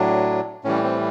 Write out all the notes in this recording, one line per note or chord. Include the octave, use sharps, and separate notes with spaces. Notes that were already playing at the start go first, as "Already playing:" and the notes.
Already playing: A2 F#3 D4
A2 E3 G3 C#4
C4